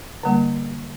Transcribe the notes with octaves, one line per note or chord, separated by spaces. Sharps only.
D3 G3 A#3